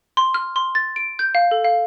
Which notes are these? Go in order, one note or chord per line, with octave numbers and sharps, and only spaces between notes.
C6
F6
C6
A6
D7
G6
F5
A4
F5